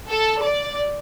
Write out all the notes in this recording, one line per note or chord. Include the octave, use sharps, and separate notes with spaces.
A4
D5